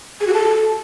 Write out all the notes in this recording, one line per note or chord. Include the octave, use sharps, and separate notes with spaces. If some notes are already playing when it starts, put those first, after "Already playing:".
G#4
F#4
A4